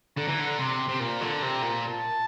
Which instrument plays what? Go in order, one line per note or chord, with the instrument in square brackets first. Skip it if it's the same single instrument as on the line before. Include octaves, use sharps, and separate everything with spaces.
[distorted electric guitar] D3 [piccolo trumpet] A#5
[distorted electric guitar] E3
D3
[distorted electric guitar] C3 [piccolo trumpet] C6
[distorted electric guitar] C3
[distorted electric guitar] A#2 [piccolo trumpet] A#5
[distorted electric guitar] D3
C3
A#2
[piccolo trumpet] A5